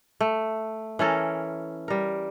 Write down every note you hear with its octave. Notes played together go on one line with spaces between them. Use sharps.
A3
E3 C#4 A4 A#4
G3 A#4